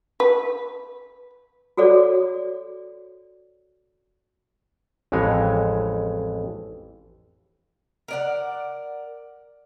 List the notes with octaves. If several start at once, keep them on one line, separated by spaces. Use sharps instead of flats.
B4
F#4 G#4 A4 C#5 D5
A1 F2 E3 G#3 C#5
A#4 D5 F#5